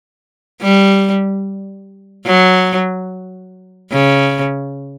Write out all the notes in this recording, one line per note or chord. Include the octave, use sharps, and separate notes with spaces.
G3
F#3
C#3